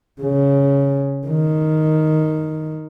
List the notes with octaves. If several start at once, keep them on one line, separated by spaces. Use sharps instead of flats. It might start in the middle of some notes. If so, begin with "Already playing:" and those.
C#3
D#3